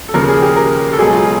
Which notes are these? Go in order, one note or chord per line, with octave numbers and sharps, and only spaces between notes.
A4
D#2 C#3 F3 A#4
G#4
G4
A#4
A4
C#2 B2 F#3 G#4
F4